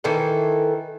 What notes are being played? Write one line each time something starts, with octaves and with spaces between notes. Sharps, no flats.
D#3 E3 A4